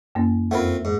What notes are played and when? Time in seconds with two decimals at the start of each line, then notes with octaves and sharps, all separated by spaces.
0.15 F#2 A#3 C#4
0.51 F2 A3 C4 F4 A#4 B5
0.85 G#2